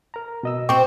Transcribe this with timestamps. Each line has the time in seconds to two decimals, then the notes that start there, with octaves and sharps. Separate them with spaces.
0.14 A#4 A#5
0.43 B2 D#5 E6
0.69 C4 C5 G5 C#6 D6